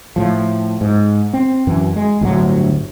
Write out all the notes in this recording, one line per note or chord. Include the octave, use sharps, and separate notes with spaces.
A2 F3
G#2
C4
F#2 E3
G#3
G1 D2 A2 F#3